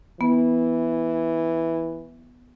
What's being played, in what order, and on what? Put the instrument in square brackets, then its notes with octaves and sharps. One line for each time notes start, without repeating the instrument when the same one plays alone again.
[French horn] E3 [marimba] B3